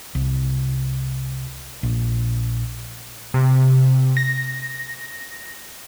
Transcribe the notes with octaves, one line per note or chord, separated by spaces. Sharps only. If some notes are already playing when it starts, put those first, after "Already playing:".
C2
A#1
C3
A#6